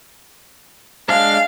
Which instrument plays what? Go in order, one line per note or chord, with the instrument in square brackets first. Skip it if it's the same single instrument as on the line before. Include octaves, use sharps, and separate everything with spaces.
[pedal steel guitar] G#3 D4 [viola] F5